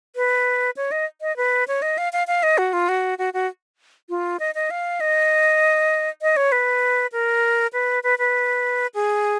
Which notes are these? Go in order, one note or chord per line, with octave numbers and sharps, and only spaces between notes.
B4
C#5
D#5
D#5
B4
C#5
D#5
F5
F5
F5
D#5
F#4
F4
F#4
F#4
F#4
F4
D#5
D#5
F5
D#5
D#5
C#5
B4
A#4
B4
B4
B4
G#4